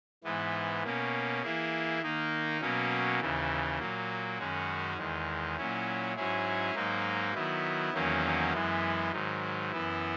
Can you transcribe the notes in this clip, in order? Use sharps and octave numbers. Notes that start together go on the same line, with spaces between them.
G#2 E3 B3
B2 A#3 C#4
E3 A#3 E4 G#4
D#3 A#3 D#4
B2 F#3 A#3 C#4
D#2 C#3 E3
A#2 F#3 A#3
F#2 D#3 G#3 C#4 F#4
E2 D#3 G#3
A#2 F#3 C#4 E4
G#2 F#3 C#4 E4 G#4
G#2 F#3 A#3 D#4
D#3 F#3 B3 E4
E2 D#3 F#3 A#3 C#4
F#2 E3 G#3 B3
G#2 D#3 F#3
F#2 E3 B3 E4